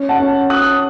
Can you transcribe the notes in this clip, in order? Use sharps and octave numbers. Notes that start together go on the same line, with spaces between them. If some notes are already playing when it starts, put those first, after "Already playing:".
Already playing: C#4
F#5 A5
C#4
C#4 D#6 F#6